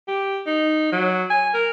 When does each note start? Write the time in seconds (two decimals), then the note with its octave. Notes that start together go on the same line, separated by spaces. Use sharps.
0.08 G4
0.46 D#4
0.92 F#3
1.30 G#5
1.54 A#4